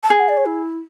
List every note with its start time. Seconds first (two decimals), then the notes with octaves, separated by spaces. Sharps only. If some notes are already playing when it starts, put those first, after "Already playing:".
0.03 A5
0.10 G#4 G#5
0.20 F#5
0.29 D5
0.37 C#5
0.46 E4